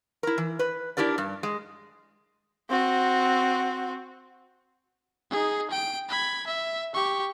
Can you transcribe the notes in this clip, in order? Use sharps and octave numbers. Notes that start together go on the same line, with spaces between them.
E4 A#4
E3
B4
D4 E4 G4 A#4 D5
G2
G#3
C4 F#4
D#4 G#4
G5 D7
B5 G#6
E5
G4 C#6